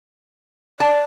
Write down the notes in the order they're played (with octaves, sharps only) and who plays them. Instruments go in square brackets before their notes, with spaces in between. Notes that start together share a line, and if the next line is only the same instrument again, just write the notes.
[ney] D5 [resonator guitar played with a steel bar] A5